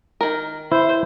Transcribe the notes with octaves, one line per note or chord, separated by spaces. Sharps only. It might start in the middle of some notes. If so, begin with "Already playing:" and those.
D#3 A#4
E4 C5